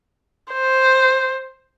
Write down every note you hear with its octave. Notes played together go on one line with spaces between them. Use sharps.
C5